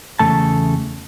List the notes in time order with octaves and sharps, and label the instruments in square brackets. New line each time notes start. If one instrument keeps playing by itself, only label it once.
[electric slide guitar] E2 C#3 A3 A5